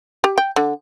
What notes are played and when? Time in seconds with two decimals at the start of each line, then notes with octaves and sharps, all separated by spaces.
0.24 G4
0.38 G5
0.56 D3